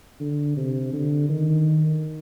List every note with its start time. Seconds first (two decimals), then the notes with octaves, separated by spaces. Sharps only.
0.20 D3
0.57 C3
0.93 D3
1.29 D#3